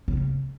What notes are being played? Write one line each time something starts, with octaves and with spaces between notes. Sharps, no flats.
C#3